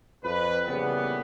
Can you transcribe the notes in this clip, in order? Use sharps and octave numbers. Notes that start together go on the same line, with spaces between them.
F2 B4
A#2 C#3 E3 G3 A3 B3